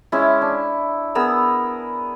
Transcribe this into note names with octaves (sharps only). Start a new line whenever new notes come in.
G#3 C#4 E4
D4
B3 G#4 A#4 E6